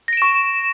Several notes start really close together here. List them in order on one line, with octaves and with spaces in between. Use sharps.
A#6 D7 E7 C#6